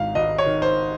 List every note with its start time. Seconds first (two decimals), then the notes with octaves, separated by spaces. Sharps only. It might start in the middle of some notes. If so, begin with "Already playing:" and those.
Already playing: G#1 G#2 F5
0.15 G#1 D#5
0.38 C#5
0.46 D#3
0.62 C5